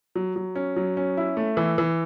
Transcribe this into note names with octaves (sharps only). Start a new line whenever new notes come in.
F#3
F#3
C#4
F#3
C#4
E4
A3
E3
E3